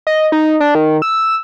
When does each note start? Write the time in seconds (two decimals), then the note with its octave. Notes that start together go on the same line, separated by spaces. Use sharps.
0.07 D#5
0.32 D#4
0.60 D4
0.75 D#3
1.02 E6